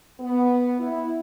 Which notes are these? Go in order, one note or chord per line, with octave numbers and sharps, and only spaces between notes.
B3
E4